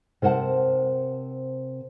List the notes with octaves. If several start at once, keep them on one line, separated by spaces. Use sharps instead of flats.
C3 A#4 C5 F#5 A5